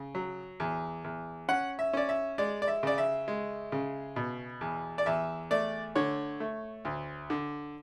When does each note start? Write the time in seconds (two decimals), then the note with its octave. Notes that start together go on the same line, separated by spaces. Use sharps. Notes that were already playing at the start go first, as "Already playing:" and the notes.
Already playing: C#3
0.15 F#3
0.60 E2
1.04 E2
1.48 C#4 F#5
1.79 E5
1.93 C#4 D5
2.09 E5
2.38 G#3 D5
2.62 D5
2.68 E5
2.83 C#3 D5
2.98 E5
3.28 G#3
3.72 C#3
4.16 B2
4.61 E2
4.98 D5
5.06 E2 E5
5.51 A3 D5
5.95 D3 C#5
6.40 A3
6.85 D2
7.30 D3